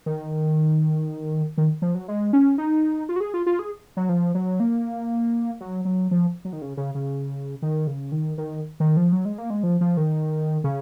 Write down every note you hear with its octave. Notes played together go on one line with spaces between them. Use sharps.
D#3
D#3
F3
F#3
G#3
C#4
D#4
F4
F#4
G#4
F4
F4
G#4
F#3
F3
F#3
A#3
F#3
F#3
F3
F#3
D#3
C#3
C#3
C#3
D#3
C#3
D#3
D#3
D#3
F3
F#3
G#3
A#3
G#3
F3
F3
D#3
C#3